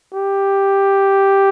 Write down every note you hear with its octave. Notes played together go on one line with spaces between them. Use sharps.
G4